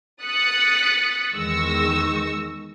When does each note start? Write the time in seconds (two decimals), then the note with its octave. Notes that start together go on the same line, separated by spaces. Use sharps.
0.23 D#6 F#6 A6 B6 C#7
1.33 E2 D#3 G#3 C#6 E6 A#6